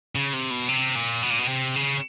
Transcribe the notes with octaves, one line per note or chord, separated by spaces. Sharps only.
C#3
C3
B2
C3
A#2
B2
A#2
B2
C3
C#3